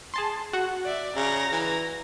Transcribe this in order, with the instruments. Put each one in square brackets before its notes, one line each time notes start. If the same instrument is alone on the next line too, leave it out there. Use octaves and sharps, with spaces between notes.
[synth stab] G#4 A5 C6
F#4 F#5
[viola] D5 E5
[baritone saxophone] C#3 [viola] A#5
[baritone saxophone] E3